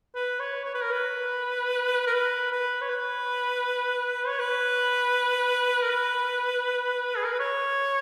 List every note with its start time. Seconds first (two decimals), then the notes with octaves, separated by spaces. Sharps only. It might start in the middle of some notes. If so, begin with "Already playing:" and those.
0.15 B4
0.40 C#5
0.65 C#5
0.74 B4
0.84 A#4
0.92 B4
2.07 A#4
2.14 B4
2.52 B4
2.81 C#5
2.89 B4
4.27 C#5
4.39 B4
5.83 A#4
5.90 B4
7.17 G#4
7.25 A#4
7.32 B4
7.40 C#5